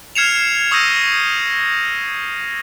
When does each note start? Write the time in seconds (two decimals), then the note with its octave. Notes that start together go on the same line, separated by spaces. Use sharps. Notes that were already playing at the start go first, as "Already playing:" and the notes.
0.15 F6 G#6 C7 C#7 E7 F7
0.71 C#6 D#6 E6 G6 A#6 D#7